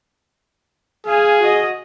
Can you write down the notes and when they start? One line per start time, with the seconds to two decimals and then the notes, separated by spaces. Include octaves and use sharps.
1.07 G#4 F5 G#5
1.40 F#4 D#5